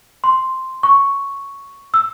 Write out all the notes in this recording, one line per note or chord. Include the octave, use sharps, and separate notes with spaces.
C6
C#6
E6